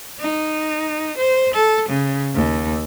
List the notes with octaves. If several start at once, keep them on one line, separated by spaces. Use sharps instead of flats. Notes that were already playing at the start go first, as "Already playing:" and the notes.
D#4
C5
A4
C#3
D#2